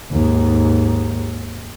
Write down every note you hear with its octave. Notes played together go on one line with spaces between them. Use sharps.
D#2 G#2